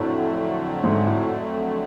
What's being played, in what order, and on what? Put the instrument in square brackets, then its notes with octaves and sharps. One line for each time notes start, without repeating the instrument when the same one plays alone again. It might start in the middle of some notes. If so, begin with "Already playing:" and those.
Already playing: [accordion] F2 D3 F#3 A3 [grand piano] A2
[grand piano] G#2
A2